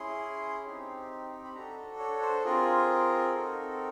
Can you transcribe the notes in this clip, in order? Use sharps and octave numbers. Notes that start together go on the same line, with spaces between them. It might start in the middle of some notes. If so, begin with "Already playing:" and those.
Already playing: C#4 E4 G#4 C6
C4 D#4 G4
B5
D4 F#4 A4 A#5
C#5
C5
C4 F4 G#4 A#4
C4 D#4 F#4 A4